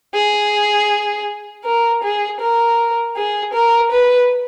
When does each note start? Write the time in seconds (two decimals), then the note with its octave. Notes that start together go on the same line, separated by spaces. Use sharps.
0.14 G#4
1.65 A#4
2.03 G#4
2.41 A#4
3.16 G#4
3.53 A#4
3.91 B4